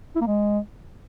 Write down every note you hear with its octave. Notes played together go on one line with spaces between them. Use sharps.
E4
A#3
G#3